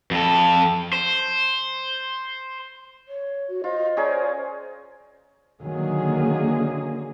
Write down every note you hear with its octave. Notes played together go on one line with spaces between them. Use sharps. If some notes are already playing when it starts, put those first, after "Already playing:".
F2 A4
C5
C#5
F#4
F4 C5 D#5
C#4 G#4 A#4 D5
D3 D#3 F#3 A#3 G#4